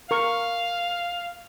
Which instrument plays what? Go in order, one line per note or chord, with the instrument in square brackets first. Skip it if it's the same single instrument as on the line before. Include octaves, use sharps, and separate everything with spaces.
[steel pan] A#4 C#6 [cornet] F5